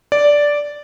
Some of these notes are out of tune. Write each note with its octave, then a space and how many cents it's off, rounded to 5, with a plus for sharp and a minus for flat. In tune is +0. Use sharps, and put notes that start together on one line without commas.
D5 -5